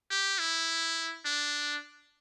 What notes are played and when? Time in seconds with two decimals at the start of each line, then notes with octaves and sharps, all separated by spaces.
0.11 G4
0.39 E4
1.25 D4